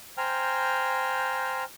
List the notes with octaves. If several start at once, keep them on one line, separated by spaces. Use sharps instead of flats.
C5 G5 G#5 A#5 F6